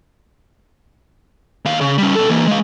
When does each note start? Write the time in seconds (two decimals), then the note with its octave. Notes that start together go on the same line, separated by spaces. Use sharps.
1.65 D#2 F5
1.81 C#3
1.98 G3 C#4
2.15 B2 A4
2.29 E3 A#3
2.47 G#3 F5